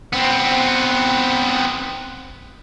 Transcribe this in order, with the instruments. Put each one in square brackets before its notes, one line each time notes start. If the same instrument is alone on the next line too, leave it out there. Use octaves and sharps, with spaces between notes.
[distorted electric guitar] B3 C4